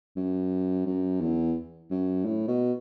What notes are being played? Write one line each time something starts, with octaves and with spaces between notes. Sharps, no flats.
F#2
F#2
E2
F#2
A2
B2